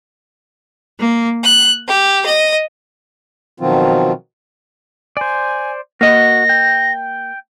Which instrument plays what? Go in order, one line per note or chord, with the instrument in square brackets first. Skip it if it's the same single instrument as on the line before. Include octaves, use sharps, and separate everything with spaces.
[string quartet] A#3
F#6
G4
D#5
[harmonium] B2 D#3 F3 F#3 C4 F4
[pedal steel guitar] C5 D5 [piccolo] G#5
[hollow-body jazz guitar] A#3 D#5 [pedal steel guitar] F#4 [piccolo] A#6
[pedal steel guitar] G5